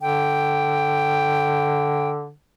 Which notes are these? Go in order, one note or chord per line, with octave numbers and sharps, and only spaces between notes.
D3 G5